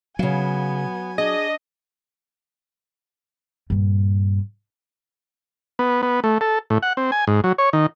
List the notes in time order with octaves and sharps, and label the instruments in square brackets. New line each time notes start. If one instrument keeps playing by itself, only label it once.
[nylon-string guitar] C#3 F5 [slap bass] F#3 [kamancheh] B3 G#5
[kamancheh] D4 [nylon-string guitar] G#4 [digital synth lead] D#5
[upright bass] G2 A#2
[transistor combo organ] B3
B3
A3
A4
A2
F#5
C4
G#5
G#2
F#3
C#5
D#3